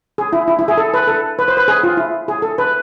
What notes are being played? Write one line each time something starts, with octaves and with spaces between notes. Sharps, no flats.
G#4
E4
E4
E4
G#4
A4
B4
A4
B4
C5
B4
G#4
F4
E4
G#4
A4
B4